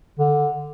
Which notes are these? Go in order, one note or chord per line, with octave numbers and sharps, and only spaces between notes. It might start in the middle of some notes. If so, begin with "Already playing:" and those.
D3